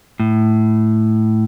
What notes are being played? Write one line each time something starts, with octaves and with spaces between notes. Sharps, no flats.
A2